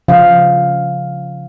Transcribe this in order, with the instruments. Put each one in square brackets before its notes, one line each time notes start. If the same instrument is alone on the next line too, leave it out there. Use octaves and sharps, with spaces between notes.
[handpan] C#3 F3 F5